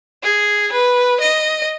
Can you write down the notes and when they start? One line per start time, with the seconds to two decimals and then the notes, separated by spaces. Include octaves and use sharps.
0.23 G#4
0.73 B4
1.21 D#5